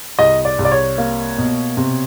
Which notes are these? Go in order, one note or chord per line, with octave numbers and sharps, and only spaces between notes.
C2 D#5
D5
C2
D5
C#5
A#3
B2
C3